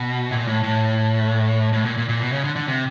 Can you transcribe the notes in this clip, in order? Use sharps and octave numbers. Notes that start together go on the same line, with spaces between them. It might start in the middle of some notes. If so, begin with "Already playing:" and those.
Already playing: B2
A#2
A2
A2
A2
A#2
A#2
A#2
B2
C#3
D3
D3
C3